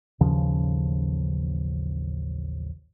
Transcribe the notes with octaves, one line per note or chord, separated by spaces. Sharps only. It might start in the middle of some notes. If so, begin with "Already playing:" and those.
A1 D#2 C#3 F3